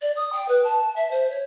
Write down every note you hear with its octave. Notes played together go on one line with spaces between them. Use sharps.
D5
D#6
G5
B4
A5
E5
C5
C#5